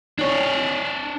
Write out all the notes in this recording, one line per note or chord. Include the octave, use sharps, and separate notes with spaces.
D4 C#5